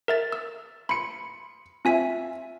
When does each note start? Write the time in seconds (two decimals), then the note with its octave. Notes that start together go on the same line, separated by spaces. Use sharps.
0.08 A#4 E5 A6
0.32 E6
0.89 B5 C6 C#7
1.85 C4 F4 E5 G#5 B6